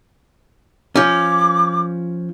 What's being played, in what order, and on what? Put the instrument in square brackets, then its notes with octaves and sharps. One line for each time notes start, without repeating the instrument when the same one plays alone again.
[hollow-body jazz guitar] F3 C#4 [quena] D6